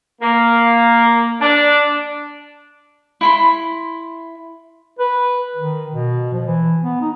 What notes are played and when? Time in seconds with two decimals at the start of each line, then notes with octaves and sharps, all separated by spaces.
0.22 A#3
1.41 D4
3.21 E4 B5 C6
4.99 B4
5.57 D#3
5.92 B2
6.33 F3
6.47 E3
6.83 B3
7.01 D#4